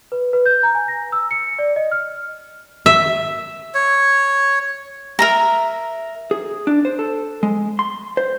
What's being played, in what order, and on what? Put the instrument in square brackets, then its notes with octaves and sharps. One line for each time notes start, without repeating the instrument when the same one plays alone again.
[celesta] B4
B4
G6
A#5
G#5
A#6
E6
C#7
C#7
D5
D#5
F6
[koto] E5
[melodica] C#5
[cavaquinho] A#4 E5 A#5
[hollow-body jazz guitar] G#4
D4
C5
A4
G#3
C6
C5